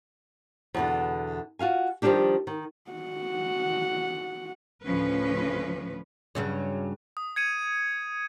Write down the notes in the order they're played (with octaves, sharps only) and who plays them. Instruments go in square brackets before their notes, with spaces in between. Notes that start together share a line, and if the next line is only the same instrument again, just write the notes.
[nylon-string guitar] E2 B2 D3
F4 F#4 F5 G#5
D#3 F3 G3 G#3 D4 G4
D#3
[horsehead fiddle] F#4 F#5
[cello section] D2 A2 C#3 F3 C#4 B4
[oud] G2 C#3 F#3
[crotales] D#6
G#6 C#7 D#7